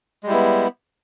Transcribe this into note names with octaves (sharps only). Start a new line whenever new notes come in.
G3 G#3 B3 E4